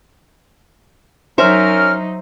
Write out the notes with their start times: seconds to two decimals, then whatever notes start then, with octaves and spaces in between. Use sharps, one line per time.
1.38 F#3 C#4 D#4 A#4 C5 E5 F6